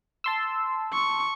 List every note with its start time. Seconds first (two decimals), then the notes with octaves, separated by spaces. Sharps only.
0.24 A5 C6 E6
0.93 C#6